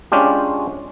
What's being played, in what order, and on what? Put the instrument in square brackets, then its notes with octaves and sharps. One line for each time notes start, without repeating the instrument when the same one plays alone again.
[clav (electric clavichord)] G#3 C#4 D4 F4 G4